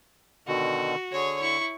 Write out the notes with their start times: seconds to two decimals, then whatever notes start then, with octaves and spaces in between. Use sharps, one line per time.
0.47 B2 D3 D#3 F#4
1.12 D3 G#4 C#5
1.42 E4 C#6